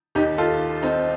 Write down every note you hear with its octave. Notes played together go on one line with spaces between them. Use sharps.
D#2 D#3 D#4 G4
F4 A4
C4 D#4